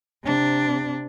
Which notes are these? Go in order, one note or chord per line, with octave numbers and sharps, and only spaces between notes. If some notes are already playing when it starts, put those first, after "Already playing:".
C3 D4